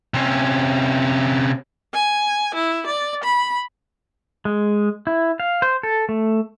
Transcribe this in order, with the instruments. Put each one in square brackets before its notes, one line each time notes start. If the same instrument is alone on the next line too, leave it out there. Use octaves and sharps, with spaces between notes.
[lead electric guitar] C3 C#4
[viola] G#5
E4
D5
B5
[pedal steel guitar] G#3
E4
F5
C5
A4
A3